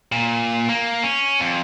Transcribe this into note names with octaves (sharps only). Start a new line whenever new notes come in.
A#2
A#3
C#4
F2